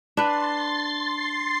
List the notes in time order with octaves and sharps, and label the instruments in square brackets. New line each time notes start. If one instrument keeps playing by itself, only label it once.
[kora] D4 B4 [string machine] C6 A6 C7